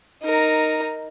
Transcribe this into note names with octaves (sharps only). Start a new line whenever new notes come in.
D#4 A#4